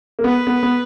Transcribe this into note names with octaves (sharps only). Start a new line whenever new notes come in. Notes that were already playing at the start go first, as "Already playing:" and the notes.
A#3
B3 B4
B3
B3